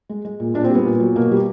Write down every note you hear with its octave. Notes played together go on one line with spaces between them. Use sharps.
G#3
G#3
A#2
A#2 D4
C4
G3
B3
A#2
F#3
B2 A#3
G3